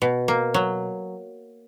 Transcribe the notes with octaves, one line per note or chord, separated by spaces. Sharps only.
B2
A#3
F#3